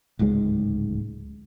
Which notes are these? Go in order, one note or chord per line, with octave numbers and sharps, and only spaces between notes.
D1 C#2 G#2 G#3